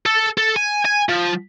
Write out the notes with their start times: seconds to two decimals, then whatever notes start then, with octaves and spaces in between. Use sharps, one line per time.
0.06 A4
0.38 A4
0.56 G#5
0.85 G#5
1.09 F3